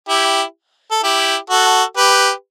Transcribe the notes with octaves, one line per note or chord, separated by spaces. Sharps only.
E4 G4
A4
E4 G4
F#4 A4
G4 B4